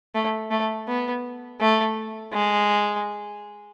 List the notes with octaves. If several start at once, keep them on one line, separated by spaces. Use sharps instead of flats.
A3
A3
B3
A3
G#3